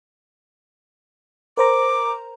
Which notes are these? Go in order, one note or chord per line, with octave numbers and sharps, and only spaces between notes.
A#4 C5 A#5 D6